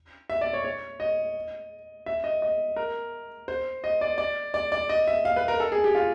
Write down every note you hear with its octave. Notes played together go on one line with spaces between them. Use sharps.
E5
D5
C#5
C#5
D#5
E5
D#5
D#5
A#4
C5
D#5
D5
D5
D5
D5
D#5
E5
F5
B4
A#4
A4
G#4
G4
F4